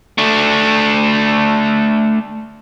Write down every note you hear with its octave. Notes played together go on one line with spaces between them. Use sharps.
A3 D4